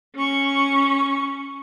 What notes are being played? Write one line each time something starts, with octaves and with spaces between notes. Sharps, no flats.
C#4 C#6